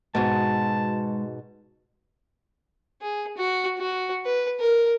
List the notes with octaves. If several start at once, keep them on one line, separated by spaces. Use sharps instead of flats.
G#2 B2 G#3 F#4 A5
G#4
F#4
F#4
B4
A#4